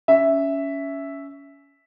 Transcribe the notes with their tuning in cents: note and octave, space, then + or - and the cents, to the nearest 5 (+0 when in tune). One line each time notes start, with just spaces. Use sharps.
C#4 +20 E5 +0